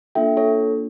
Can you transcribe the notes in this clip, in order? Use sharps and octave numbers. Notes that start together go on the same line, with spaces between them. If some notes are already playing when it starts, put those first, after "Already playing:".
A#3 D4 F4 A4 E5 G5
A4 C#5